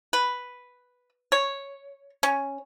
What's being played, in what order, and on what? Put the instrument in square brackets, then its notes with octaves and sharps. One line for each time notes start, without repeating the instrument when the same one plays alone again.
[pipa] B4
C#5
C#4